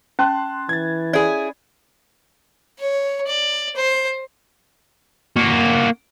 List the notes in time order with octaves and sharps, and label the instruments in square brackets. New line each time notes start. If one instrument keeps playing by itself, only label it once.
[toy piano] C#4 [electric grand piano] A5 C6 F#6
[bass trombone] E3 [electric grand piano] G#6 A6
[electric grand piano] C#4 [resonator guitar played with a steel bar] E4 G#4 [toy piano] D5
[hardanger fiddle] C#5
D5
C5
[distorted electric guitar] A#3 F#4